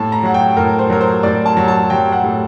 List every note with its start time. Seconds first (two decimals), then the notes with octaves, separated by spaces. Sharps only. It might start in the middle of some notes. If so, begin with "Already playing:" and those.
Already playing: A2 A5
0.12 A#5
0.23 F#3 F#5
0.34 G5
0.57 A2 A#4
0.79 C5
0.90 F#3 A#4
1.01 C5
1.23 A2 D5
1.46 A5
1.57 F#3
1.68 A5
1.90 F#3 G5
2.12 F#5
2.24 A2